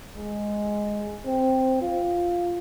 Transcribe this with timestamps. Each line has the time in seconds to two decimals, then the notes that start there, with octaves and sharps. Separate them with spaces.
0.16 G#3
1.27 C4
1.82 F4